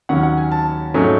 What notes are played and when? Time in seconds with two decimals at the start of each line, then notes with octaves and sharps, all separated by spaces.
0.09 D#2 D#3 F#3 C#4 F#5
0.23 F#5
0.37 G#5
0.52 A5
0.94 G#2 F#3 A3 C#4